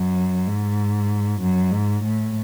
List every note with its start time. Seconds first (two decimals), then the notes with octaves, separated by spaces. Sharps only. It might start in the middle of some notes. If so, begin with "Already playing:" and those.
Already playing: F#2
0.47 G#2
1.41 F#2
1.72 G#2
2.04 A2